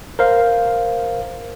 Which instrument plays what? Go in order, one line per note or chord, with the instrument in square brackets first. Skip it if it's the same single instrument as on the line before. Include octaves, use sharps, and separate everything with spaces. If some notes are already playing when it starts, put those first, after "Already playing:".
[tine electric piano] A#4 C5 F5